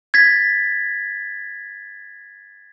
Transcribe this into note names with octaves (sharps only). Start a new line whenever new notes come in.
G#6 A6 B6